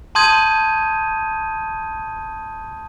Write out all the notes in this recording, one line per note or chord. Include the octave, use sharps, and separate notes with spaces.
A5 C6 D#6 G6 G#6 D#7